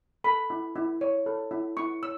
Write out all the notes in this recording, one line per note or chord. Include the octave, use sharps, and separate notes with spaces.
A4 B5
E4
E4
C#5
A4
E4
E4 C#6
C#5 E6